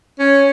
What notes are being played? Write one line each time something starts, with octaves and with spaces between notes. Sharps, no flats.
C#4